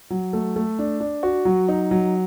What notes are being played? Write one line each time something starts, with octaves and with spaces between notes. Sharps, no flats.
F#3
A3
A3
D4
D4
F#4
F#3
D#4
F#3